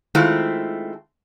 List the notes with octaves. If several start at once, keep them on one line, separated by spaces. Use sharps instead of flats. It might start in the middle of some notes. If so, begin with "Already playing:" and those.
D#3 G#3 A3 C4 E4 F4